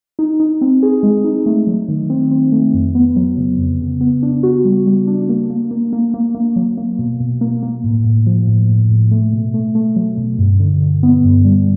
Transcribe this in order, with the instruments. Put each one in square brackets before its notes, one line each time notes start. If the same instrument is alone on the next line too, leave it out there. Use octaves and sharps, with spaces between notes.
[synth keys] D#4
D#4
C4
G#4
G#3
D#4
A3
F#3
D#3
C4
C4
A3
F2
B3
F#3
C#3
F2
C#3
B3
D4
F#4
G3
G3
D4
A#3
A#3
A#3
A#3
A#3
A#3
F#3
A#3
B2
B2
A#3
A#3
A2
A2
F3
A2
A2
A2
A3
B2
A3
A3
F#3
B2
G2
D3
D3
B3
G2
G3